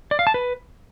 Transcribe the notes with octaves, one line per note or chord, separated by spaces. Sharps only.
D5
F5
A5
B4